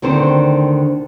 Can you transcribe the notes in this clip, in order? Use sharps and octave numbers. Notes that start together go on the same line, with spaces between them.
D2 D3 D#3 C4 C5